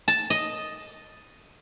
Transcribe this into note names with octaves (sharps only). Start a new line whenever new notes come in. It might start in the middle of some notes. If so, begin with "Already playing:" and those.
A5
D#5